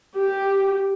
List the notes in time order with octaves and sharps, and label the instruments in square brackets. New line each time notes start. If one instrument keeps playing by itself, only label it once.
[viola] G4